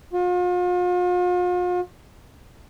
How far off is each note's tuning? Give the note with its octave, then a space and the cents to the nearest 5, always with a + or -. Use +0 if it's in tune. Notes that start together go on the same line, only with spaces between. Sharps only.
F4 +40